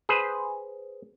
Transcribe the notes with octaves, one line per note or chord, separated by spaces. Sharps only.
G#4 B4 C5